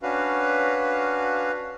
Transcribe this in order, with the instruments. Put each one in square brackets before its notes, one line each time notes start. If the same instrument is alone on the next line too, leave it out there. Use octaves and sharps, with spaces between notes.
[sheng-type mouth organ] C#4 D4 F#4 B4 F5